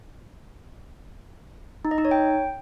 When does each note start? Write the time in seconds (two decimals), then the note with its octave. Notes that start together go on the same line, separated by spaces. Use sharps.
1.85 D#4
1.91 D#5
1.98 D#4
2.05 C#5
2.11 G5